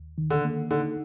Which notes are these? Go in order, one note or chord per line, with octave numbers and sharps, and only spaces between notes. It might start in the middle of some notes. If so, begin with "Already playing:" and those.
Already playing: D#2
D#3
D3
A#3
D3 D#4